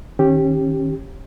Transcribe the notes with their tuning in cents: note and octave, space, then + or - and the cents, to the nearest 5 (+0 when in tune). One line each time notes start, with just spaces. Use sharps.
D#3 -5 C#4 -30 G4 +0